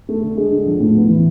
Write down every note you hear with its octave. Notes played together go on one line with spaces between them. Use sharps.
A3
D3
G#3
D3
F3
A2
B3
E3